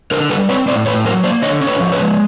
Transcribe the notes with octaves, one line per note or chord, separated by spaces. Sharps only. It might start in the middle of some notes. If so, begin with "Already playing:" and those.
D3 A#4 C5
G3 A4 B4
C4 B4 C#5
A2 C5 D5
A2 B4 C#5
F#3 A#4 C5
A#3 C5 D5
D3 C#5 D#5
C#4
B4 C#5
F3
B4 C#5
G#3